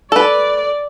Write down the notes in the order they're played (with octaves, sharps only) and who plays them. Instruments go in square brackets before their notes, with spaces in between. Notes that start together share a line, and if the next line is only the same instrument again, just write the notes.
[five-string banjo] A4 B4 [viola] D5